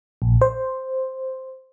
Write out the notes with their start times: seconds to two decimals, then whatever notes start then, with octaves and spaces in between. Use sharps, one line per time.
0.22 A#1
0.41 C5